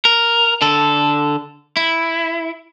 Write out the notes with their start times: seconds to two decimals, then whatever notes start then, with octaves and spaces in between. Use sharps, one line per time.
0.05 A#4
0.62 D3 A4
1.77 E4